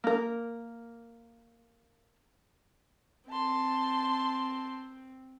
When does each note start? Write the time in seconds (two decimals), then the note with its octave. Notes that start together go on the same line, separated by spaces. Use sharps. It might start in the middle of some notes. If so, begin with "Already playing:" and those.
0.04 A#3 A#4
3.30 C4 A5 C6